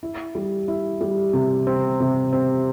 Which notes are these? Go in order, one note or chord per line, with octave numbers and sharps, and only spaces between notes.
E4
G3
E4
G3
C3
C4
C3
C4